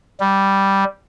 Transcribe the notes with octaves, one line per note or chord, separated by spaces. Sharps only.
G3